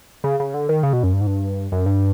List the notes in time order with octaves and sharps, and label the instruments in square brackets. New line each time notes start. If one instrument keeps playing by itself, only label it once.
[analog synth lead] C#3
C#3
D3
D#3
C#3
B2
F#2
G2
G#2
G2
F#2
G2